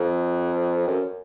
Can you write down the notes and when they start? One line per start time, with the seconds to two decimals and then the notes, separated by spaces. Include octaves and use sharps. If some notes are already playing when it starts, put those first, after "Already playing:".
Already playing: F2
0.88 F#2